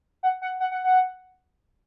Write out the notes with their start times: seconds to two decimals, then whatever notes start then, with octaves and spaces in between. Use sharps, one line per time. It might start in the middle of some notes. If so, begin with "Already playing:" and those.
0.23 F#5
0.42 F#5
0.60 F#5
0.72 F#5
0.84 F#5